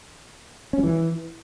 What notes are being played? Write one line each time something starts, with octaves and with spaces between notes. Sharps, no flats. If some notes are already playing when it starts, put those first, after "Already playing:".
C#4
F#3
E3